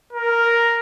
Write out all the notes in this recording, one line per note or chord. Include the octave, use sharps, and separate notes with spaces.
A#4